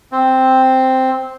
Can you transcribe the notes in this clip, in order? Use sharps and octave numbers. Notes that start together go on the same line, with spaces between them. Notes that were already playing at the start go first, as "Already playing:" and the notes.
C4